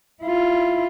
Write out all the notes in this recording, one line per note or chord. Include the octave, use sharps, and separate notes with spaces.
E4 F4